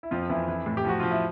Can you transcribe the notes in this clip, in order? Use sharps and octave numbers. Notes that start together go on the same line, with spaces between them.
E4
F2 F3 F4
F2 E3 E4
E3
A2
G4
F3 F#4
F3 F4
E4